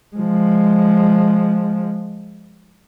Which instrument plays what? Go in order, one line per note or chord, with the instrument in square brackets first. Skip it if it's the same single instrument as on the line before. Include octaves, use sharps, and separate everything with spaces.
[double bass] F3 G#3